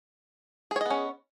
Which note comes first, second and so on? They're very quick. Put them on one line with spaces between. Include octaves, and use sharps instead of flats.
G#4 C#5 D#5 B3 C#4